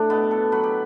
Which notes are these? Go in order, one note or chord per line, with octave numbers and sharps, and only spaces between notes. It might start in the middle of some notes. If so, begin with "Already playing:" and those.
Already playing: A2 D4
B2 B3
A4
F#3 B4
G4